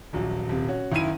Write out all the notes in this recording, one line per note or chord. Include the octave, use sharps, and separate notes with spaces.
D#1 A#1 F#3
D#1 C3
C#4 F#4
F#1 D#3 E4 D#7